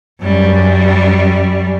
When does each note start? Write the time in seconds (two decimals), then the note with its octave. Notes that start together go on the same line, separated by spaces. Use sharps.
0.21 F#2 G3